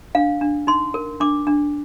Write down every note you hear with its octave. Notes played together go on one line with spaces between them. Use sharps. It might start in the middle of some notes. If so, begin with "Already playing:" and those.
D4 F5
D4
D#4 C6
A#4
D4 D6
D4